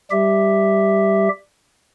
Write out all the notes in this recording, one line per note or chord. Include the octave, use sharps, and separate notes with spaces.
G3 G4 E5